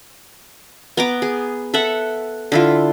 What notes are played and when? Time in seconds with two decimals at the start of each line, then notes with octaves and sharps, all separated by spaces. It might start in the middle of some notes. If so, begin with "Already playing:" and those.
0.97 B3 A#5 D6
1.22 G#4
1.74 A4 E5 F#5
2.52 D3 E4 F4